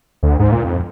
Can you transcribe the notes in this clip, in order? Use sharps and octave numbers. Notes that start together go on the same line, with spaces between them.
D2
G#2
A#2
F2